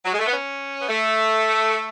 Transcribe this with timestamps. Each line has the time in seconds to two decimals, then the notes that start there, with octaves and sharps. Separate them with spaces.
0.05 F#3
0.12 G#3
0.19 A3
0.26 B3
0.32 C#4
0.81 B3
0.89 A3